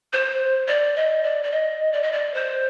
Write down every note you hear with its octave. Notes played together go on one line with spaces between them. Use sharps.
C5
D5
D#5
D5
D5
D#5
D5
D#5
D5
C5